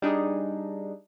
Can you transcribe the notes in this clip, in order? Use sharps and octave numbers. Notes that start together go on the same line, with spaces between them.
G3 D4 D#4 G#4